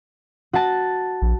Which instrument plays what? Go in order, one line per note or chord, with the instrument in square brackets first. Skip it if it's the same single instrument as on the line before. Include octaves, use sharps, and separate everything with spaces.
[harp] F#4 A5
[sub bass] A#1